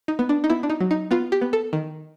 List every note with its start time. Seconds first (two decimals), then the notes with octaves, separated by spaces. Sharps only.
0.08 D#4
0.19 B3
0.29 D4
0.44 D#4
0.50 B3 E4
0.63 D4
0.70 D#4
0.80 F#3
0.91 D#4
1.11 B3 F4
1.32 G4
1.41 B3
1.53 A4
1.73 D#3